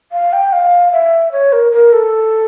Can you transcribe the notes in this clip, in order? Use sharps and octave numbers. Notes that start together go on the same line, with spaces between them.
F5
G5
F5
E5
C#5
A#4
A#4
A4